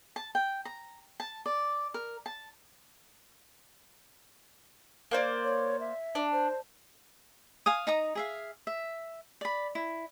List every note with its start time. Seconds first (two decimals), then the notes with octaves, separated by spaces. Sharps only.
0.16 A5
0.35 G5
0.65 A#5
1.20 A5
1.46 D5
1.94 A#4
2.26 A5
5.11 A#3 C5 D5
5.44 C#5
5.80 E5
6.15 D4
6.32 C5
7.66 F5 G#5 D#6
7.87 D#4 A#5 D#6
8.15 G#4 E5 F5
8.67 E5
9.41 D5 B5
9.75 E4